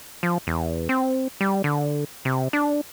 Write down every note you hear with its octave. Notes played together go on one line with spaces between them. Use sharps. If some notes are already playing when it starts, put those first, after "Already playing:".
F3
E2
C4
G3
D3
C3
D4